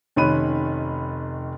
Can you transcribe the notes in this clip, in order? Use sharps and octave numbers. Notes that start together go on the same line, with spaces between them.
F1 D#3 C#4 B5 F#6 D#7